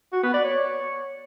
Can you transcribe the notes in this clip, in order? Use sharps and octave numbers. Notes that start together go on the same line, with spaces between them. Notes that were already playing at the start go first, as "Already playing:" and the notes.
F#4
B3
D5
C#5